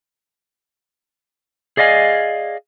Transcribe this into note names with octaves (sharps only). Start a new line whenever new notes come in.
G#4 D5 D#5 F5 G#5